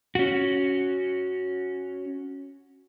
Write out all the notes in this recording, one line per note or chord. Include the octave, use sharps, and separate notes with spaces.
C#4 F#4